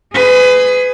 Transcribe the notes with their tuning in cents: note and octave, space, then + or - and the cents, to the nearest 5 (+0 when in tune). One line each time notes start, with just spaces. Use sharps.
G#4 +0 B4 +30